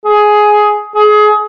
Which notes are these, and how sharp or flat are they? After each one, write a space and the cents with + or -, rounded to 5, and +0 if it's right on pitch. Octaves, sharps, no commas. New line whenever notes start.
G#4 +10
G#4 +25